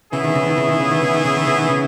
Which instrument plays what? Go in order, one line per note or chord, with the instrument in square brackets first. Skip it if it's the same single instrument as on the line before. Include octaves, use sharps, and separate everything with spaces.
[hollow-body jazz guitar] C#3 [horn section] E3 B3 E4 G#4
[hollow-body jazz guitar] D#3
C#3
D#3
C#3
D#3
C#3
D#3
C#3
D#3
C#3
D#3
C#3
D#3
C#3